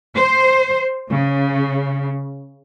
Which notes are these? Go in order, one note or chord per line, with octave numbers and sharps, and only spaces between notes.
C5
C#3